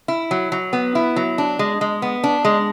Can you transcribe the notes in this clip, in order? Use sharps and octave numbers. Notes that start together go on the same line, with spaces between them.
E4
F#3
F#3
B3
E4
F#3
D4
G#3
G#3
B3
D4
G#3